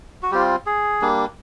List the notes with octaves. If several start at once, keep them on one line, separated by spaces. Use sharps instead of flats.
F#4
G3 C4 F4 G4
G#4
G3 A#3 D4